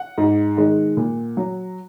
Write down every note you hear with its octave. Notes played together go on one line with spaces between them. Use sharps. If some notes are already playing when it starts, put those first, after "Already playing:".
Already playing: F#5
G#2
D#3 G#3
A#2
F#3